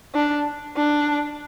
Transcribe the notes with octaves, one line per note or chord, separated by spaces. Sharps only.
D4
D4